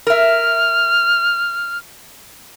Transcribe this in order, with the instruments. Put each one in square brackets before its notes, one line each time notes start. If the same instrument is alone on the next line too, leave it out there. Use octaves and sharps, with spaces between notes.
[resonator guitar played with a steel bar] A#4 E5 [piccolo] F6